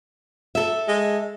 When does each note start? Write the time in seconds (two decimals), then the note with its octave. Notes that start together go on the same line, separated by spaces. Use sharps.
0.55 A4 E5
0.88 G#3